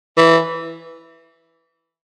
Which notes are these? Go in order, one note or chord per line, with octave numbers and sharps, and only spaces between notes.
E3